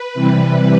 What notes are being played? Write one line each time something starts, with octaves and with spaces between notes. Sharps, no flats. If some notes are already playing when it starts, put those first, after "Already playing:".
Already playing: B4
C3 E3 G3